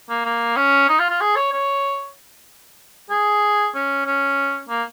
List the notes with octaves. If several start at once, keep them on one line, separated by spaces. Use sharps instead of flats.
A#3
A#3
C#4
D#4
F4
F4
G#4
C#5
C#5
G#4
C#4
C#4
A#3